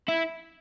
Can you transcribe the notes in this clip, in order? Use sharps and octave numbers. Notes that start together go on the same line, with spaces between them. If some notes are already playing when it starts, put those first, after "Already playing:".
E4